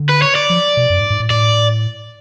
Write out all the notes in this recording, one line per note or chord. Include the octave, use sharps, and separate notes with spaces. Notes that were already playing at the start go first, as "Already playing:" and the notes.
Already playing: D3
B4
C#5
D5
F3
B2
F#2
G#2
G#2
A2
A2 D5